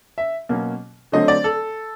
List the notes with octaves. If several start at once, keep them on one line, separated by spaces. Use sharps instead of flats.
E5
B2 F#3 A#3 C#4
D3 F#3 A3 C4 D#5
D5
A4